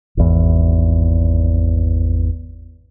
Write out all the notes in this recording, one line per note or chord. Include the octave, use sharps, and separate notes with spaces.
G#1 E2